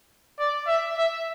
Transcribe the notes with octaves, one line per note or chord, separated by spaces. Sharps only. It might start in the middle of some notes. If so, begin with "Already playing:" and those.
D5
E5
E5